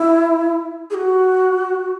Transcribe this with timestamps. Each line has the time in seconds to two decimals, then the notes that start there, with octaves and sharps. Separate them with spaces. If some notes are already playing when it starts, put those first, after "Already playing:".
Already playing: E4
0.90 G#4
0.94 F#4